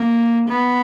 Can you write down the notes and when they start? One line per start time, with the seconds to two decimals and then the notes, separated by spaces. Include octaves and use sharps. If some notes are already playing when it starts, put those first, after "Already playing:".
Already playing: A#3
0.49 B3